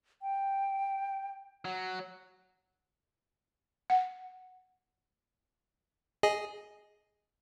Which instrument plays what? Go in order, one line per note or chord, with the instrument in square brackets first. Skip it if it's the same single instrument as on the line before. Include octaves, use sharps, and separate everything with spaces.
[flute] G5
[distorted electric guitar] F#3
[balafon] F#5
[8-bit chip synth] G#4 D#5 G#5